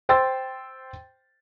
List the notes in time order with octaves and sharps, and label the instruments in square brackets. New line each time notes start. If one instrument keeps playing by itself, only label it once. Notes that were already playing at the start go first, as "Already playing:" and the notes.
[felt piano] C5 G5 C6 E6 A6